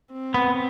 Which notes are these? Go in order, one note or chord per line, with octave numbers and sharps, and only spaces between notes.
C4
B3